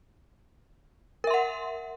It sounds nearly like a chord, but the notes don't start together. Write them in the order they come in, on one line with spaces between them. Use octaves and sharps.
A#4 E5 C6 F#5